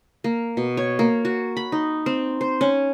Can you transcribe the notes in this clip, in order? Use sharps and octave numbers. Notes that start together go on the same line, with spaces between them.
A#3
B2
C#5
A#3
F#4
B5
D#4
C4
C5
C#4